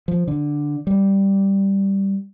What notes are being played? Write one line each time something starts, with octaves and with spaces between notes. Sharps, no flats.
F3
D3
G3